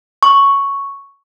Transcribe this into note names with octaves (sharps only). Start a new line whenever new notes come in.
C#6